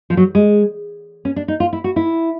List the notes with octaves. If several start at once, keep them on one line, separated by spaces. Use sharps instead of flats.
F3
F#3
G#3
C#4
D4
D#4
F4
E4
F#4
E4